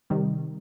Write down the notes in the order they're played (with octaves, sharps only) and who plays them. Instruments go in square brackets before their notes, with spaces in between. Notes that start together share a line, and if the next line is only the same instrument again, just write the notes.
[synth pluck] C3 D#3 G3